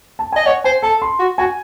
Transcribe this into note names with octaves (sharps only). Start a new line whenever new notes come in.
A5
D#5 G#5
C#5 F#5
C5 G#5
A4 A5
C6
F#4
F#4 G#5